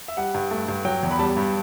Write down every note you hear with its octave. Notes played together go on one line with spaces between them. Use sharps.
E5
G3 F#5
G2
A3
G2
F#3 G5
E2
B5
G3 A5
G2